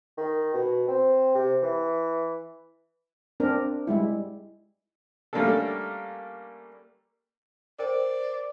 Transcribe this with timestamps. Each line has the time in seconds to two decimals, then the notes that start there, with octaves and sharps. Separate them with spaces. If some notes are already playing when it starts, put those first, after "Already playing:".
0.17 D#3
0.54 B2
0.88 C4
1.35 C3
1.63 E3
3.40 C4 D4 A#4
3.87 G3 G#3 E4
5.33 G3 A3 A#3 C#4 D4 A4
7.79 A#4 C5 D5 G5